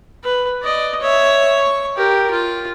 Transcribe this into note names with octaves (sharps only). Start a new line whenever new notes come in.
B4
D5 D#5
C#5 E5
C#6
G4 A#4
F4